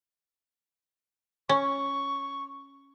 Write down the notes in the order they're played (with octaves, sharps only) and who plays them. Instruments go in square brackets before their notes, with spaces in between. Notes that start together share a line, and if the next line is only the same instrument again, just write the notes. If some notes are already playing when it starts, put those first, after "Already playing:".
[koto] C#4 [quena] C#6